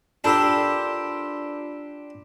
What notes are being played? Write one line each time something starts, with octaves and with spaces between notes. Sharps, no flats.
D4 F4 G4 A4 A#4 C5 B5 E6